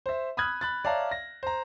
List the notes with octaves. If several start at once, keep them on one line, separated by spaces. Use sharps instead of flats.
C5 E5
B5 D#6 F6 F#6 G#6
B5 F#6 A6
C#5 D5 E5 F5 A5 A#5
A#6
C5 A#5